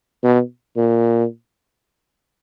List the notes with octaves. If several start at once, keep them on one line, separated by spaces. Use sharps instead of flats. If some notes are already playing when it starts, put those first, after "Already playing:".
B2
A#2